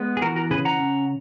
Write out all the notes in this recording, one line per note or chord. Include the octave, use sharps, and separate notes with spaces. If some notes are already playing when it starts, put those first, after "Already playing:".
Already playing: G#3 B3
G#4
E3 F#4 A#4
F#4 A#4
C#3 G#4 B4
F#5 A#5
C#4